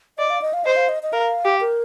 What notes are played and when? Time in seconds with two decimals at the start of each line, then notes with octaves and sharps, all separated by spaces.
0.18 D5 D#5
0.30 F5
0.42 D#5
0.53 F5
0.64 C5 D#5
0.76 F5
0.89 D#5
1.03 D#5
1.13 A#4 F5
1.45 G4
1.61 A#4